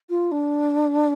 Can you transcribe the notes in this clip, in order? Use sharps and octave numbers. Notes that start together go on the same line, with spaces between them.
F4
D4